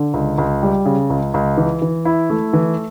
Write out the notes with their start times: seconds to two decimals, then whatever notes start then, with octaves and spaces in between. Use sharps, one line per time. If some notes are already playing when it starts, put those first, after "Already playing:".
Already playing: D3
0.14 C#2
0.38 C#2
0.63 G3
0.86 C#3
1.10 C#2
1.34 C#2
1.57 E3
1.82 E3
2.05 E4
2.30 A3
2.53 E3